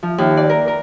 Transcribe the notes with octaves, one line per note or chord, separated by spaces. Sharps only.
F3
D#2
D5
A#4
A#4